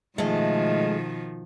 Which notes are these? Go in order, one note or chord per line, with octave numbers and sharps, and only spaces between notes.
B2 D#3 F3 G#3 A3